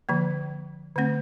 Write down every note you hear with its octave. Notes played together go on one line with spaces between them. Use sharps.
D3 F3 A#3
D3 A3 C4